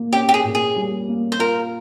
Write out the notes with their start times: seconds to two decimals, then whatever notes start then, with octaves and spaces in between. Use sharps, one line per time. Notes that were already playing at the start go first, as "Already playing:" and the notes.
Already playing: A#2 A#3
0.13 C#4 G4
0.29 G4
0.34 G#4
0.45 A#2
0.55 G#4
0.76 G3
1.08 A#3
1.32 C5
1.39 F4 A#4